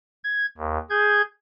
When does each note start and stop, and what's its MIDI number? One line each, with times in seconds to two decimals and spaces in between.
0.24 0.46 92
0.57 0.78 39
0.90 1.22 68
0.90 1.22 91
0.90 1.22 92